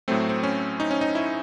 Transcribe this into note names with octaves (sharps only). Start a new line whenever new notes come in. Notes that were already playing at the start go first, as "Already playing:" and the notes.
A2 F#3 A3 C4
C4
C#4
D#4
C#4
D#4
E4